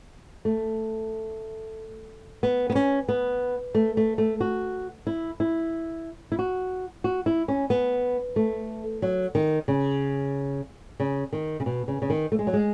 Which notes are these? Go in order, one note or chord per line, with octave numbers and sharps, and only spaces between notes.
A3
B3
B3
C#4
B3
A3
A3
A3
F#4
E4
E4
E4
F#4
F#4
E4
C#4
B3
A3
F#3
D#3
C#3
C#3
D#3
C#3
B2
C#3
C#3
D#3
A3
G#3
F#3
G#3